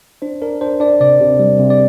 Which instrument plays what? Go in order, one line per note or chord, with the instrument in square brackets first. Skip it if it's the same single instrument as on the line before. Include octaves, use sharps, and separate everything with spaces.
[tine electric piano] D4 C5
D4 A#4
D4 C5
D4 D5
C3 D5
C3
G3
C3
D5